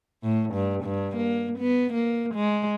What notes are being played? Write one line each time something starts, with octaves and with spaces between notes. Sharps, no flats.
A2
G2
G2
A#3
B3
A#3
G#3